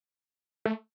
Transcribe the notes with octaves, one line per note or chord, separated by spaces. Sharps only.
A3